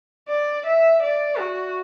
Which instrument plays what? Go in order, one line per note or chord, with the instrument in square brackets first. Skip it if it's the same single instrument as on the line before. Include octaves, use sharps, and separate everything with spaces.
[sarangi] D5
E5
D5
F#4